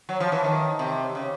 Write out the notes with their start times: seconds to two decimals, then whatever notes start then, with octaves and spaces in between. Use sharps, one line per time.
0.09 F#3
0.20 F3
0.32 E3
0.44 D#3
0.79 C3
1.15 C#3